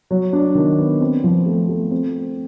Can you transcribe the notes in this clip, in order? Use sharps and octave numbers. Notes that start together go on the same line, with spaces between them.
F#3
D4
D#3
B3
C4
F3
A3
A3
C4